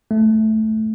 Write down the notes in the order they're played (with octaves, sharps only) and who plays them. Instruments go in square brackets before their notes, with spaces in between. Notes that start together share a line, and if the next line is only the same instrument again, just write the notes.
[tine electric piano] A3